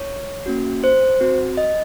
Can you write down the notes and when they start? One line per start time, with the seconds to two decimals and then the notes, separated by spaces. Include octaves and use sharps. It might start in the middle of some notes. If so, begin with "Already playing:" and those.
Already playing: C#5
0.46 A#3 C#4 F#4
0.84 C5
1.21 C4 F#4
1.57 D#5